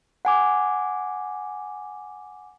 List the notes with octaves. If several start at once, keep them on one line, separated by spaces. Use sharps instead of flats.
F#5 G#5 D6